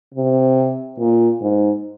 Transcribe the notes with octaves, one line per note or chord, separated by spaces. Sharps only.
C3
A#2
G#2